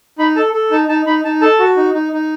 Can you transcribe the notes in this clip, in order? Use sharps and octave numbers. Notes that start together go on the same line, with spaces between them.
D#4 B5
A4 A5
A4
D#4 A5
D#4 A5
D#4 B5
D#4 A5
A4 A5
F#4
D#4
D#4
D#4